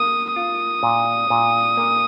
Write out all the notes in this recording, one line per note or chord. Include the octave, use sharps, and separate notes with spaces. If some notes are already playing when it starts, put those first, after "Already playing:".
Already playing: A#3 D#6
F4 D#6
A#2
A#2
A#3